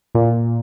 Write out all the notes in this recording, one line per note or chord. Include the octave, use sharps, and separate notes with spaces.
A#2